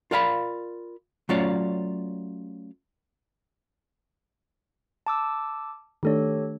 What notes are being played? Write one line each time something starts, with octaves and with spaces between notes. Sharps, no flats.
F4 A#4 D5 F5 G#5 B5
F#3 A3 C#4 F4 C#5 D5
A5 D6 E6
D#3 A3 D4 G4 A4 C#5